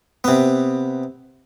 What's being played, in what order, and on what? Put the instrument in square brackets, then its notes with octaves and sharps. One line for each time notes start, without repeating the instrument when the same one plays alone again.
[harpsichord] C3 B3